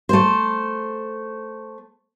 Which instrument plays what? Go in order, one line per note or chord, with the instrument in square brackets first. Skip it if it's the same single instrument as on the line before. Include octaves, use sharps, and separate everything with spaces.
[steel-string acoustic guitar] A3 C5